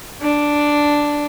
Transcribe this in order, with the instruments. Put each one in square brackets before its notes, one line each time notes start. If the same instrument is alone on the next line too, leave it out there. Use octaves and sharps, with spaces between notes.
[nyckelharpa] D4